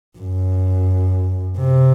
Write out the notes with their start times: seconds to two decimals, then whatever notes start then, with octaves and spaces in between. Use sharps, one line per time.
0.18 F#2
1.57 C3